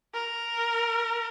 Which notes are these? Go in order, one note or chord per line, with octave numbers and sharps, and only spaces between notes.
A#4